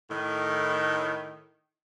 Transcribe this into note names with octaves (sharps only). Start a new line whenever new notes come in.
A2 D#3